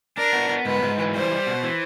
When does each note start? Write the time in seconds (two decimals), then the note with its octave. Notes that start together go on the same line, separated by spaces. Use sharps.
0.17 D4 A#4
0.33 B3
0.49 B3
0.65 G#2 B4
0.82 G#2
0.98 E3
1.15 G3 C5
1.31 G3
1.47 B2
1.63 E3